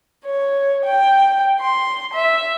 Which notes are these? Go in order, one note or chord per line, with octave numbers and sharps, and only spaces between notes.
C#5
G5
C6
E5